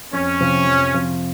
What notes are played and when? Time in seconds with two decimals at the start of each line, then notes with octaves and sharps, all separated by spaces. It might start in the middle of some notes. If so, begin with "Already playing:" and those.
0.13 F2 C#4
0.40 C3 F3 C4 F4
0.67 F2
0.94 C3 F3 C4 F4